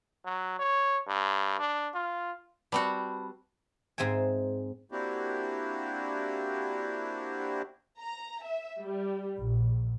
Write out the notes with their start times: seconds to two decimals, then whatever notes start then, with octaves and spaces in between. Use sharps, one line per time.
0.25 F#3
0.59 C#5
1.07 G2
1.59 D4
1.94 F4
2.72 G3 C4 F#4 B4 A5 B5
3.98 G#2 C4 G#4 E5 G#5
4.92 A#3 C4 D4 E4 F#4 G4
8.00 A#5
8.44 E5
8.83 G3
9.39 A#1